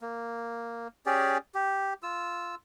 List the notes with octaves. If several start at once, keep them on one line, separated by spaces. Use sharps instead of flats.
A#3
C#4 G4 G#4 D5
G4
F4 E6